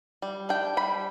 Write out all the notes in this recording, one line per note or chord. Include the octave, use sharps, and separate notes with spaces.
G3
D4 G5
G3 B5